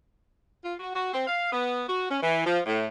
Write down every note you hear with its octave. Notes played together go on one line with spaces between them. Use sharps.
F4
F#4
F#4
C4
F5
B3
F#4
C#4
E3
F3
A2